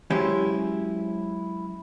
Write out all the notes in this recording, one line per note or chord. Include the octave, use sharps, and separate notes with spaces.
F#3 G#3 C#4 E4 G4 C5